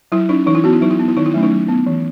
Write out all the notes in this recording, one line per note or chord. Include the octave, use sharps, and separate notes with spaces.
F#3 E4
C#4 D#4
E3 D#4
E4
B3 F#4
E4
F#3 D#4
E4
B3
E4
D#3 D#4
E4
F#3 A3 C#4
D#4
F#3
B3
E3